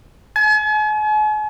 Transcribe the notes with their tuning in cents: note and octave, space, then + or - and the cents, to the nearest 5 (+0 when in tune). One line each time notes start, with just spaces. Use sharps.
G#5 +45